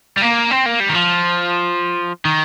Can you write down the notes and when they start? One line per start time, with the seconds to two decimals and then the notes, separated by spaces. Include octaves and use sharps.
0.17 G3
0.22 A#3
0.51 C4
0.66 A#3
0.80 G3
0.89 D#3
0.95 F3
2.25 D#3